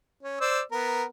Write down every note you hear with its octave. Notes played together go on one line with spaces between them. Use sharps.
C#4
C5 D5 E6
B3 A#4